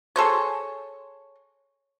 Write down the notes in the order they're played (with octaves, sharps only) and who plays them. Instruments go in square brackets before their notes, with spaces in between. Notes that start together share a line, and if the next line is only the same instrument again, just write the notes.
[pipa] G#4 A4 C5 C#5